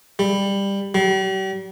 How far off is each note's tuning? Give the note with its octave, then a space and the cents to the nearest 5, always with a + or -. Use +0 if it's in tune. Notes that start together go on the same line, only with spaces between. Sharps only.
G3 +15
G3 -40